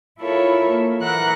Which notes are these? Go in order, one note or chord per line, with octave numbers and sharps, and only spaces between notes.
E4 F4 A4 A#4 C#5 E5
A#3
E3 A#4 E5 F#5 F#6 A#6